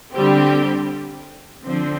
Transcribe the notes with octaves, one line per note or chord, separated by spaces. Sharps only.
D3 G3 C4 G4
D3 F3 C4